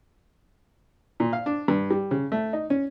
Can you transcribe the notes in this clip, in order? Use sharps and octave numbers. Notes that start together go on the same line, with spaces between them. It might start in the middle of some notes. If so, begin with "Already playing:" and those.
A#2
F5
D4
G2
G3
C#3
A3
D#4
C#4